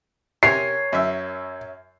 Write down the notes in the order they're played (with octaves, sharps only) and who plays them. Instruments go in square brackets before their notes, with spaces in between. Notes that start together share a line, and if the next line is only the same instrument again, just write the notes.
[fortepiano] C3 [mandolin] A#4 C#5 G#5 [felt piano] C7
[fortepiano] F#2 E5